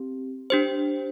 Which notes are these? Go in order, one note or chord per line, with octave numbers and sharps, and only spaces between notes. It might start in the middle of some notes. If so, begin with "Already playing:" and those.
Already playing: C4 G4
D4 G4 C5